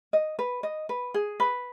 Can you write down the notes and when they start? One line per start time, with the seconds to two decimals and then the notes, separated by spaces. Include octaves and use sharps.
0.13 D#5
0.39 B4
0.63 D#5
0.89 B4
1.14 G#4
1.40 B4